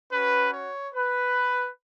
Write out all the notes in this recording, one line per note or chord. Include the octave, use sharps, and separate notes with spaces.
C#4 F#4 B4
C#5
B4